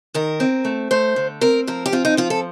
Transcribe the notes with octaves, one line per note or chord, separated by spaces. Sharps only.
D#3 A#4
C4
A3
A3 C5
D3
C4 A#4
F3 A#4
G4
C4 F4
D#4
F3 F4
A4